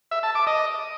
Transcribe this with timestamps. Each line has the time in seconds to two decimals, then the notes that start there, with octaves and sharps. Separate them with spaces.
0.11 E5
0.23 A5
0.35 D6
0.47 D#5